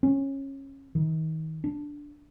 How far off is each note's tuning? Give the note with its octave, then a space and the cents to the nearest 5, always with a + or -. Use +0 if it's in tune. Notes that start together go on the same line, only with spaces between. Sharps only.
C#4 -20
D#3 +35
D4 -5